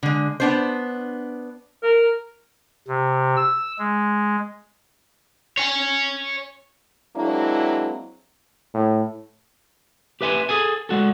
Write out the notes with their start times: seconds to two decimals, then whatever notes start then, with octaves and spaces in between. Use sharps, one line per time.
0.03 D3 G#3
0.40 B3 D4 C5
1.83 A#4
2.88 C3
3.37 E6
3.79 G#3
5.57 C#5 G#5
7.16 F#3 G#3 A#3 C4 D4 E4
8.74 A2
10.21 G4 B4 E5 G#5 C6
10.49 G#4 A4 G#5
10.89 G#3 F#4 A4